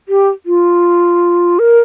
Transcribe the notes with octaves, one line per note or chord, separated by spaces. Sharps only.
G4
F4
A#4